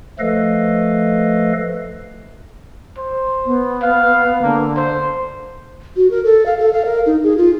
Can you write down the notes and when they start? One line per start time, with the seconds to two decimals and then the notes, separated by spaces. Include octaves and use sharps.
0.19 F3 A3 A4 B4 D#5 F5
2.98 C5
3.46 B3
3.82 F5
4.43 D3 A#3
4.77 C5
5.96 F#4
6.11 A#4
6.25 A4
6.46 F5
6.59 A4
6.73 F5
6.85 A#4
7.06 D#4
7.24 G#4
7.37 F4